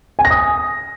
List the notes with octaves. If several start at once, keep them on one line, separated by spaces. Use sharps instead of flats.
G#5
A#6
D#6